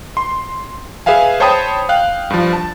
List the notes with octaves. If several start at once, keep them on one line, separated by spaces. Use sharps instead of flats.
C6
G#4 B4 E5 F5 G#5
C5 C#5 G5 A5 B5 D#6
F5 G5 F#6
G2 F3
A5